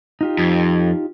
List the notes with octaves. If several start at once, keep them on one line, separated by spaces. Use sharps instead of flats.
D#4 F4 G4
F2